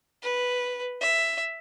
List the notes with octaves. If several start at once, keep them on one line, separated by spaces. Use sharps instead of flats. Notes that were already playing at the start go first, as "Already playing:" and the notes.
B4
E5